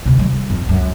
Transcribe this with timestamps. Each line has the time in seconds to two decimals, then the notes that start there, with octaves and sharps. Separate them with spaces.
0.05 D2 C3
0.18 F#3 G#3
0.33 G3
0.50 F2
0.66 C#2 F#2